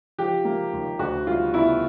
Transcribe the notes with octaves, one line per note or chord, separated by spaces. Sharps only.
F3 G4
A#3
D#2
D2 F#4
G3 F4
B3 E4